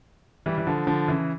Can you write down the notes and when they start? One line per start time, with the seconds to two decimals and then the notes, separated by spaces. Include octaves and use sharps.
0.46 E3 G3
0.58 E3
0.67 D3 F3
0.87 D3 F3
1.08 C#3 E3